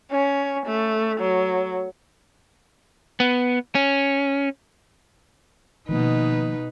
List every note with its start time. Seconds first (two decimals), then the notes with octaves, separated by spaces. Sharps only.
0.11 C#4
0.66 A3
1.20 F#3
3.20 B3
3.75 C#4
5.89 B2 D#3 F3 A#3 D#4 B4